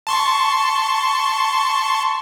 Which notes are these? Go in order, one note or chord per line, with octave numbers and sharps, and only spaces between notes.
A5 C6 C#6